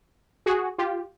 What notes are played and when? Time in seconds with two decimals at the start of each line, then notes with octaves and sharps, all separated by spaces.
0.46 F#4 G#4
0.78 F4 G4